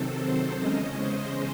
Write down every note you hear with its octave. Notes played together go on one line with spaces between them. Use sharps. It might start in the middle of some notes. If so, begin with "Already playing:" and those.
Already playing: C3 D#3 F#3 C4 A4
C5
E2 C#3 G#3 C#4 D#5
C5